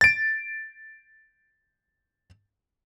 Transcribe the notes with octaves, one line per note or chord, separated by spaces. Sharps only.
A6 D7